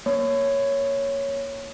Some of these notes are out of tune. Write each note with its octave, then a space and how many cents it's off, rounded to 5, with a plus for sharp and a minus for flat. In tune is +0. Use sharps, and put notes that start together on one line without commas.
A#3 +0 C#5 +0